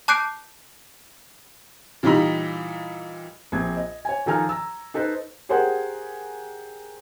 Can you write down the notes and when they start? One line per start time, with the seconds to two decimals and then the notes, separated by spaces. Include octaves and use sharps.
0.08 A5 D6 F#6 G6 C7 D7
2.03 A#2 E3 G3 D#4 A#5 B5
3.52 A#1 C4 G#6
3.77 D#5
4.05 C#5 G#5
4.26 D#3 F3 A4 G#5 A#5 F6
4.49 A#5 E6
4.94 D#4 A4 B4 C5
5.49 G4 G#4 A#4 C5 F#5 G#5